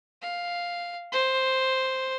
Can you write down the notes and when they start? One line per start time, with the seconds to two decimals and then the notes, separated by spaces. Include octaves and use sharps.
0.22 F5
1.12 C5